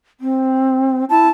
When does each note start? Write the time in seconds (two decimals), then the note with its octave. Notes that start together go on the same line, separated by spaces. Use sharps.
0.20 C4
1.10 E4 A5